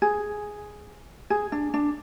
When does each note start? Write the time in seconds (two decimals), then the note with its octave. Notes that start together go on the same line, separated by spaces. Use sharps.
0.02 G#4
1.30 G#4
1.52 D4
1.74 D4